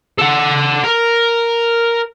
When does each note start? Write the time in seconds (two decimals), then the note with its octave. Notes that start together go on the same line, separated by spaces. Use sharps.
0.18 A4 F#5
0.83 A#4